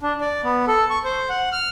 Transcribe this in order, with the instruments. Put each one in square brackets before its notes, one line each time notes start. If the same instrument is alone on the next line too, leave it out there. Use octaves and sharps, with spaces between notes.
[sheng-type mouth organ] D4
D5
B3
A4
C#6
C5
F#5
F6